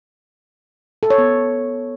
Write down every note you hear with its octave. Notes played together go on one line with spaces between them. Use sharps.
A4
C#5
B3